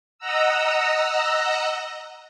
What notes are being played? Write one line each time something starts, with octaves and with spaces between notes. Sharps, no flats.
D#5 F#5 A#5 E6